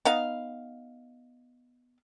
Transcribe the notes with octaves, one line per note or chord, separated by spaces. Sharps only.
B3 D#4 F5